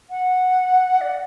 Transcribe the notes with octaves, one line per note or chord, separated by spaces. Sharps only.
F#5
D5